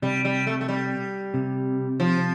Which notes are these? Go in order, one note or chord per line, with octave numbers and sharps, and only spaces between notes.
C3 G3
G3
A3
A3
G3
C3
F3